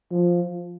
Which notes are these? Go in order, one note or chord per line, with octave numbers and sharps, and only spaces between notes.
F3